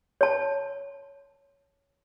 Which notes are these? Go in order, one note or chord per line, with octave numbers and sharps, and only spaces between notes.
C#5 A5